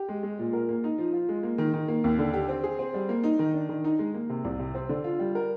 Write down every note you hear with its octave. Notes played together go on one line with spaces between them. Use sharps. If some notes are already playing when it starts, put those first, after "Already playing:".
Already playing: G4
G#3
G#3
A#2
A#4
A#3
D#4
F3
F4
G#3
A#3
D#3
D#3
A#3
D#2
D3
G4
C4
G#4
C4
G3
A#3
D#4
D#3
D4
D#3
D#4
G#3
A#3
C3
C2
C3
C4
D3
F4
G3
A#4